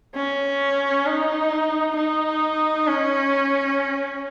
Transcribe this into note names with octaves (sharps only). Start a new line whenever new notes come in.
C#4
D#4
D#4
C#4